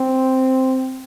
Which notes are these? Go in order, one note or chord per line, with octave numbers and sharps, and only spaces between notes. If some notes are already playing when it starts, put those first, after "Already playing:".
Already playing: C4